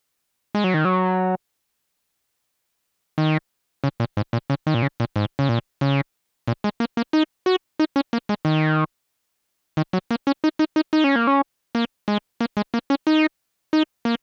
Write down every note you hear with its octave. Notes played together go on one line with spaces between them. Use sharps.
G#3
F#3
D#3
F#3
D#3
C#3
A#2
G#2
A#2
C#3
D#3
A#2
C#3
A#2
G#2
C#3
A#2
C#3
A#2
G#3
A#3
A#3
D#4
F#4
D#4
C#4
A#3
G#3
D#3
D#3
F#3
A#3
C#4
D#4
D#4
D#4
D#4
C#4
A#3
C#4
A#3
G#3
A#3
G#3
A#3
C#4
D#4
D#4
A#3